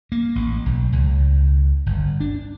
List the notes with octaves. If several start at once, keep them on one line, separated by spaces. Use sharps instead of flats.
A#3
A1
B1
C#2
G1
D4